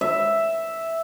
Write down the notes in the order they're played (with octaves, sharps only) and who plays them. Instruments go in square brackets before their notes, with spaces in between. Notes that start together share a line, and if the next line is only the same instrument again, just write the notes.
[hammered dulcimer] E5